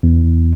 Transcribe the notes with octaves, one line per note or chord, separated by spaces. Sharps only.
E2